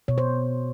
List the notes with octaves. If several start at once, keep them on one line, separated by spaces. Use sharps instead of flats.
B2 C#5
C5